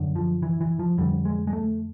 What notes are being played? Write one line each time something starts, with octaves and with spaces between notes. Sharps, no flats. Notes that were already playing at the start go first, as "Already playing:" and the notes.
Already playing: F#2 D3
F3
E3
E3
F3
F2 D3 G3
G#3
G#3
A3